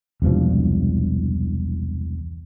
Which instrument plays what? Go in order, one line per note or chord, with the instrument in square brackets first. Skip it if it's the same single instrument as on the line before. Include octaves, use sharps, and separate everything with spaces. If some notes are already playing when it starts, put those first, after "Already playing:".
[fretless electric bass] E1 C2 G2 F3